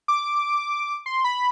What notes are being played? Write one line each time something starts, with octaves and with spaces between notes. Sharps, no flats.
D6
C6
B5